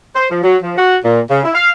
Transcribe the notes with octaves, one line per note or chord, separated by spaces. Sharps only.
C5
F3
F#3
F3
F#4
A#2
C#3
E4
F5